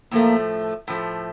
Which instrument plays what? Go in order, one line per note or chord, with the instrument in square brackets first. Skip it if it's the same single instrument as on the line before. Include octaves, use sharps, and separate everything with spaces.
[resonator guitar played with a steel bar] A2 F3 A3 [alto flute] A#3
[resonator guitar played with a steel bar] A2 F3 A3